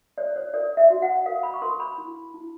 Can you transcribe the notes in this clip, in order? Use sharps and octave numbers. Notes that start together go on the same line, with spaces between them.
C#5 D5
C#5
A#4 D5
E5
F#4
F#5
A#4 F5
B5
C#6
A#4 C6
B5
E4
E4